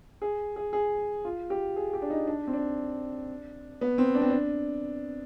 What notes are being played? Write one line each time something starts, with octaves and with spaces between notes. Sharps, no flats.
G#4
G#4
G#4
F4
G4
G#4
G4
D4
D#4
D4
C4
D4
B3
C4
D4
C4
D4